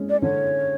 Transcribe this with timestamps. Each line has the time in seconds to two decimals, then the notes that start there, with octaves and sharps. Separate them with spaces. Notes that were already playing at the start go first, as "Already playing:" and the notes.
Already playing: G#3 C#4
0.10 D5
0.22 D3 C#5